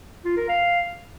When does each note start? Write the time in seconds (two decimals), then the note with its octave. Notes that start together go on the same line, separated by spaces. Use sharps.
0.25 F4
0.37 A#4
0.49 F5